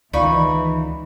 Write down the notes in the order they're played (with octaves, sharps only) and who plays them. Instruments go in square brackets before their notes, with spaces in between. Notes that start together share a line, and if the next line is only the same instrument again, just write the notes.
[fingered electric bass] C#2 D#3 [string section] E3 [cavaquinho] D#4 B5 C#6 [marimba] D5 F5